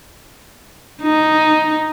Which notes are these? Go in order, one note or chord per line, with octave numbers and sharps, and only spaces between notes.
D#4